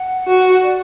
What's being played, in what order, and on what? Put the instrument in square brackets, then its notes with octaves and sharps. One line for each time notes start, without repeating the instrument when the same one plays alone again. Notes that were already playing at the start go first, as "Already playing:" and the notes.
Already playing: [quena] F#5
[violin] F#4
[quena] D5